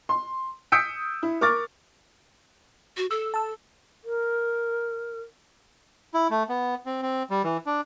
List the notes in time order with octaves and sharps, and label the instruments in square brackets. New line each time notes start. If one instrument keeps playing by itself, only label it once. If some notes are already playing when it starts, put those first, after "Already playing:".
[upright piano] C6
D#6 E6 G6 B6 C#7 D7
E4
A#4 C#6 D6 F6 A6
[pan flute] F#4
[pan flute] A4 [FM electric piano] E6
[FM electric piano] A5 E6
[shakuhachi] A#4
[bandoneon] E4
A3
B3
C4
C4
G3
E3
D4